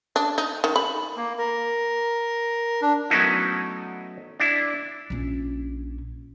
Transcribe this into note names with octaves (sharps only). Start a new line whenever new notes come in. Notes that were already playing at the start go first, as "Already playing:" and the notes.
D4
D#4
D#3
B5
A#3
A#4
D4
F#3 A3 B3 C#4 D#4 E4
D4 E4
A#1 C#4